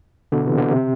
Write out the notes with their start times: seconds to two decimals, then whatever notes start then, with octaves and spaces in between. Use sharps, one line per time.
0.32 B2 D3
0.46 C3 E3
0.58 B2 D3
0.72 C3